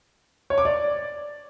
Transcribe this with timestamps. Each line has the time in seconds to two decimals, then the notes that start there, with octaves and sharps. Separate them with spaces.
0.50 C#5
0.58 D6
0.65 D5